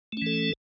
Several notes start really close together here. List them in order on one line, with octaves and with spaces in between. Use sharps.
A3 C#4 E3 A4